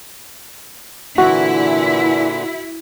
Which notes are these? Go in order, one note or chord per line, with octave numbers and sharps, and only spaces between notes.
A#2 D3 E3 E4 F#4